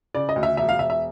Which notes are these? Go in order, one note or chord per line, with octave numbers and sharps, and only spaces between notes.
C#3 D5
D#5
D2
E5
E1 E5
F5
E1 E5
E5